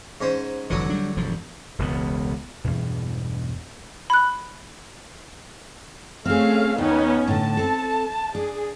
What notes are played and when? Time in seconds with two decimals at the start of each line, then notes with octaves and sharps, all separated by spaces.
0.21 G#2 C#4 C5
0.70 F1 D3 E3 F#3
0.89 G3 D4
1.17 E1 G2 F3
1.79 E1 C#2 B2 B3
2.64 E2 G2 B2
4.10 B5 F#6
6.25 A3 C4 C#4 G#4 F5
6.78 D#2 B3 C#4 D#4
7.28 A2 D3 A5
7.57 C4 A4
8.35 D4 G#4